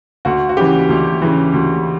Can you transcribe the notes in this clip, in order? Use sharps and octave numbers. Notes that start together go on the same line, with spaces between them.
D2 F#4
F#4
C#3 E3 G4
D2
C#3 E3
D2